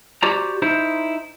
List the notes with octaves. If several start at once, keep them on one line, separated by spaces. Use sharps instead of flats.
F#4 G4 C5 D5 A#5
D#4 E4 C5